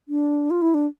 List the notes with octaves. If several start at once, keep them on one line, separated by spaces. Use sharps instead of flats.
D4
F4
E4
D4